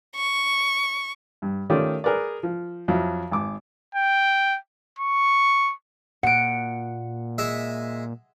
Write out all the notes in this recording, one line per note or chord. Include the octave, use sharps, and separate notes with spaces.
C#6
G2
D#3 A3 C#4 F4 G4 D5
G#4 A#4 B4 D5
F3
F2 F3 F#3 E4
G#1 D6
G5
C#6
A#2 F#5 C#7 D7
G#3 E5